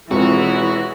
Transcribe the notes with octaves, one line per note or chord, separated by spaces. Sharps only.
E1 F2 E3 F#4 G#4